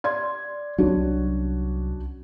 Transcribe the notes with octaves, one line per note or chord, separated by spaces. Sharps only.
D5 C6 G#6
C2 F#3 C#4 D4 F#4